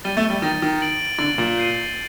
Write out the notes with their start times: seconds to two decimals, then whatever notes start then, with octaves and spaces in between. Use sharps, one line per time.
0.04 G3 A6 D#7 G7
0.17 A3
0.30 G3
0.42 D#3 A6 D#7 G7
0.62 D#3
0.81 A6 D7 F#7
1.19 D3 A6 D7 F#7
1.38 A#2
1.58 G6 C7 D#7 G7